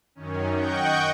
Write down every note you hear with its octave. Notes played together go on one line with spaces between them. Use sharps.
F#2 D#3 C#4
D#5 F#5 G5 C#6 G6